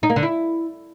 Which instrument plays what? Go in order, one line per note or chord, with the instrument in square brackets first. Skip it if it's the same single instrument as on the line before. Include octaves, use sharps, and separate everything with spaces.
[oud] D#4
A#3
D3
E4